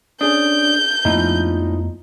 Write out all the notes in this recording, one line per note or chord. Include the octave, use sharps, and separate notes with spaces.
C#4 D4 G#4 D#6 G6
F2 A#2 F3 A3 B3 D#4 E4